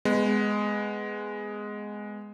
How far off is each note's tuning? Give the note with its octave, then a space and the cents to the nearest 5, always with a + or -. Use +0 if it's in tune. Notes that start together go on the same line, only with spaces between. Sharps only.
G#3 +0 B3 +15